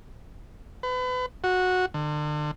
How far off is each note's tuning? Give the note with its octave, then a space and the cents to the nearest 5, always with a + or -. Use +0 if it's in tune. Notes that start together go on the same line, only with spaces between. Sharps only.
B4 +35
F#4 -10
D3 +35